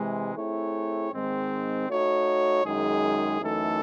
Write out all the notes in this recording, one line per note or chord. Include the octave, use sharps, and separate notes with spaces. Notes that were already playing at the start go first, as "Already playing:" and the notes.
Already playing: C3 E3 G#3
A3 C4 E4 G#4 C#5
G#2 D#3 G#3 C4
A3 D#4 F#4 C#5
F#2 D#3 G#3 D#4 G#4
F#2 E3 A3 D#4 A4